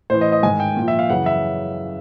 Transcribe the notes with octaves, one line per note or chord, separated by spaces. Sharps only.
A2 E3 C5
D#5
D#5
G#2 D#3 G#5
G5
A#2 F3
E5
F5
F#2 C#3 E3 F#5
E5